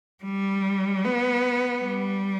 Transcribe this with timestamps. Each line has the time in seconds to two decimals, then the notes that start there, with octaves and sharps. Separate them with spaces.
0.24 G3
1.05 B3
1.83 G3